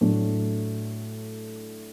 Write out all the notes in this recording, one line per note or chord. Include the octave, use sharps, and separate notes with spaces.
A2 F#3 A3 D4